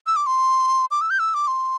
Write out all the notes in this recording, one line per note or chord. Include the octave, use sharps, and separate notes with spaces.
E6
D6
C6
D6
E6
G6
E6
D6
C6